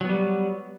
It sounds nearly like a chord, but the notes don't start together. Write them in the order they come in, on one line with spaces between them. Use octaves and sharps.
F#3 B3 G3